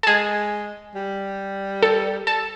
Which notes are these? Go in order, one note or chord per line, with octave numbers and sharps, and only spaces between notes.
A4
G#3 G#4
G3
A4
A4